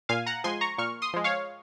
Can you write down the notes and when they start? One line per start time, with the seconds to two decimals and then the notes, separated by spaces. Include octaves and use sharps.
0.09 A#2 F5 G#5
0.26 F#5 A#5
0.44 F3 G#3 G#5 C6
0.61 A#5 C#6
0.78 A#2 C#6 F6
1.02 C6 D#6
1.14 F3 G#3
1.24 C#5 F5